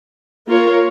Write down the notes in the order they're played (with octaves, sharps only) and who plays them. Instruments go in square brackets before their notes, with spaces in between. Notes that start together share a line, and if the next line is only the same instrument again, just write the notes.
[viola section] A#3 F4 A#4 C#5